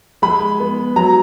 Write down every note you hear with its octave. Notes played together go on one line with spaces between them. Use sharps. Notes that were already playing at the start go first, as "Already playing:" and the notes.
G#3 B5
B3
F#3 A#5